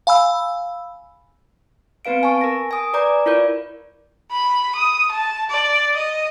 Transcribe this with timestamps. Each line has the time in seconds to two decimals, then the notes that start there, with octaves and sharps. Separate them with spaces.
0.07 F5 G#5 B5 E6
2.05 B3 C4 B4 F5 D7
2.23 G#5 A5 C#6
2.41 A#4 A#6
2.71 G#5 D#6
2.93 B4 D5 A#5 D6 G6
3.26 E4 F4 A#4 C#5 D5 G6
4.32 B5
4.76 D#6
5.11 A5
5.50 D5
5.97 D#5